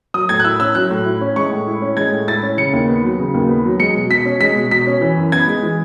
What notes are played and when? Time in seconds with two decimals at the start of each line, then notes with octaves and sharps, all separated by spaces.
0.14 F#3 D#6
0.29 A2 G#6
0.40 F#6
0.44 E4 E6
0.60 C#4 E6
0.75 F#3 F#6
0.91 A2
1.06 E4
1.21 C#4
1.36 G#3 C#6
1.51 A2
1.67 E4
1.82 C#4
1.97 G#3 G#6
2.12 A2
2.27 E4 A6
2.43 C#4
2.58 C#3 C#7
2.73 D#2
2.88 B3
3.04 F#3
3.19 C#3
3.34 D#2
3.49 B3
3.65 F#3
3.80 G#3 C#7
3.95 B2
4.10 B2 B6
4.25 C#4
4.40 G#3 B6
4.56 B2
4.71 B2 B6
4.87 C#4
5.02 E3
5.17 F#2
5.32 B3 G#6
5.48 G#3
5.63 E3